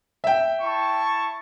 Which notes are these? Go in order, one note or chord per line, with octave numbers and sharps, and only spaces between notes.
E5 G5
E4 A5 C#6